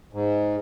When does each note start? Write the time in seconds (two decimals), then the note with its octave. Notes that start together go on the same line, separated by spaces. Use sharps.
0.13 G#2